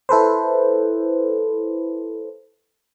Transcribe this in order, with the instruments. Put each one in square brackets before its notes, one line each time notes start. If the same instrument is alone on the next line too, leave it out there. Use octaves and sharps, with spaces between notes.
[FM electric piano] E4 A4 B4 C5